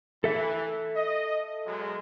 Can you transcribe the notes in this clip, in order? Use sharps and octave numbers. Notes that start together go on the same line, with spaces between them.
E3 A4 E5
D#5
B2 F#3 G#3